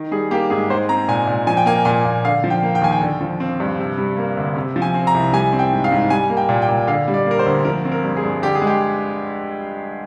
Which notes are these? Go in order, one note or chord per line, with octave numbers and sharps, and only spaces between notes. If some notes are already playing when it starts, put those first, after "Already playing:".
Already playing: D#3
G3 G#4
A#3 G4
G#2 G#4
G#3 C5
C4 A#5
A#2 G#5
A#2
F3 G#5
G5
A#3 G#5
A#2 G#5
A#2
D3 F5
F3
G5
A#3
G5
D#2 G#5
G5
D3
F3
C4
G2
C3
G3
A#3
D2
C3
F3
G#5
C4
A#5
C2
G3 G#5
C4
G5
G#2
F5
G#2
G3 G#5
A#3
G5
A#2
G5
A#2
D3 F5
G3
D5
A#3 A#4
C5
D2
F3 A#4
C4
A#4
G2
G#4
G2
D3 G4
G#4
G#3
G4